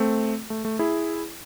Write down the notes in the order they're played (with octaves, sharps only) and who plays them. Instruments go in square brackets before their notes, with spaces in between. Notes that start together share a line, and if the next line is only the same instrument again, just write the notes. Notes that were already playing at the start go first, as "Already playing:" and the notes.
Already playing: [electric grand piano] A3 C4
A3
A3
E4 G#4